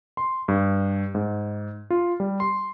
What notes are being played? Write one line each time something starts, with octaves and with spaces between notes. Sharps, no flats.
C6
G2
G#2
F4
G3
C6